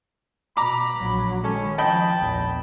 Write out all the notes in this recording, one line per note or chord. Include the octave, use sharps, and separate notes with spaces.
B2 A#5 B5 D6
A#1 F#3
D#3 G#3 C#4 A4
F3 D#5 G5 A5 B5
A#1 E2